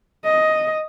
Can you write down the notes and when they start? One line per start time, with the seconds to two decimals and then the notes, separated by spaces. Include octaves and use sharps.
0.25 D#5